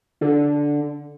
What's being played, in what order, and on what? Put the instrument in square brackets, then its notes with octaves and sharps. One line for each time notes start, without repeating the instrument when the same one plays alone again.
[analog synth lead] D3